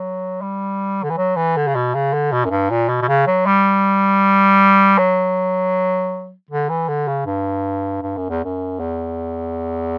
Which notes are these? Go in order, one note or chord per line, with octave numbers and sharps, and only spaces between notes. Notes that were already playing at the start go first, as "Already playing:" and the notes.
Already playing: F#3
G3
D3
E3
F#3
E3
D3
C#3
B2
C#3
D3
B2
F#2
G2
A#2
B2
B2
C#3
F#3
G3
F#3
D3
E3
D3
C#3
G2
G2
F#2
E2
F#2
E2